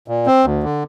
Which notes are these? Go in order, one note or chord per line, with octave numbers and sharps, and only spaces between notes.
A#2
C4
D2
D3